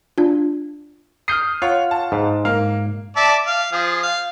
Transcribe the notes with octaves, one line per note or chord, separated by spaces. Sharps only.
D4 F4
D#6 F6 G6 C7
F4 C#5 F5 F#5 C6
A5
G#2
G#2 A#3 F5
D5 E5 A5
F5
F3 G#4
F5